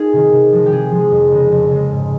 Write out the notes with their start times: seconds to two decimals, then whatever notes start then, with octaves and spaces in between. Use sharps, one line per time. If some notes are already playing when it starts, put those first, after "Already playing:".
Already playing: D#4 F4 G#4
0.13 C3 D#3
0.32 C3
0.52 F3 G#3
0.66 G4
0.72 C3 G#4
0.92 F3 G#3
1.11 F2
1.32 C#3 G#3
1.51 F2
1.71 C#3 G#3
1.91 G#2